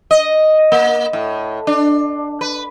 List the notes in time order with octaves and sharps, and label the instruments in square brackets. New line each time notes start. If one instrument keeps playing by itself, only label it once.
[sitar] D#5
A#3
A2
D4
B4